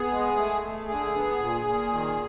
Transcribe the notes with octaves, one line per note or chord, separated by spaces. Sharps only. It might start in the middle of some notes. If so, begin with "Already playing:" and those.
Already playing: B3 G#4
G#3
A3
A3
D3 G#4
B3
A#2
A#2
D#3